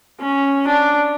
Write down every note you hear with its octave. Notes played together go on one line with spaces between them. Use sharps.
C#4
D4